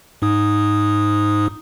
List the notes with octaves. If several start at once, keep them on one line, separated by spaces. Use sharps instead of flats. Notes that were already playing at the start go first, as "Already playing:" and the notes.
G#2 D#4 D#6